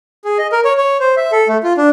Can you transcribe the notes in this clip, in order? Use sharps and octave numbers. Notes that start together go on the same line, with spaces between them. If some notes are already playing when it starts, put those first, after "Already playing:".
G#4
D#5
A#4
C#5
C#5
C5
E5
A4
A3
F4
D4